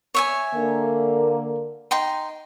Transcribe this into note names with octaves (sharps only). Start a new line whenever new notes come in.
C#5 E5 G#5
D3 A#3
D#4 G5 C6